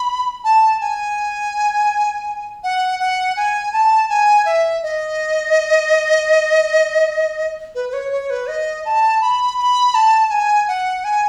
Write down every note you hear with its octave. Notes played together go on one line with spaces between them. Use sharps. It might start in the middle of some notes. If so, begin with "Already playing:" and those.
Already playing: B5
A5
G#5
F#5
F#5
G#5
A5
G#5
E5
D#5
B4
B4
C#5
C#5
B4
D#5
A5
B5
B5
A5
G#5
F#5
G#5